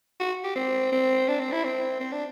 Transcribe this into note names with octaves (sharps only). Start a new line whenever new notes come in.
F#4
G4
C4
C4
D4
C4
E4
C4
C4
D4